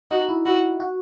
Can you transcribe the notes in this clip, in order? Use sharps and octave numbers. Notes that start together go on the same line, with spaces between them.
D#4 F#4
E4
E4 F#4
F#4